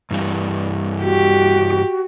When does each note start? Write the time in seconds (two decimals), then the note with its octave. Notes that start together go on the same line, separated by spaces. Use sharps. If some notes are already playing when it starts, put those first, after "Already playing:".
0.11 G2 E3 G3
1.02 F#4 G4